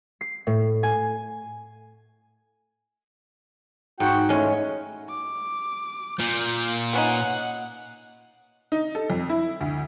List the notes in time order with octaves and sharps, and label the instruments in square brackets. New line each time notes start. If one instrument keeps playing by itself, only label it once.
[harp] C7
A2
G#5
[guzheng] G#2 [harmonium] F#4 F#5 G5
[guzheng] G#3 C#4 [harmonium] A3 E4
[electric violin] D6
[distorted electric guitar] A#2 [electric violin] G6
[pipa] B3 C#4 D#4 [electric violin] F#5
[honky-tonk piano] D#4
A4
F2
E4
D2